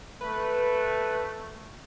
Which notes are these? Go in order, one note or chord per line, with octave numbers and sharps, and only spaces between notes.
A3 B4